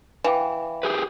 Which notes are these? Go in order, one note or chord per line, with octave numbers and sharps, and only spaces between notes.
E3 F5 G5 D6
G4 G#4 B4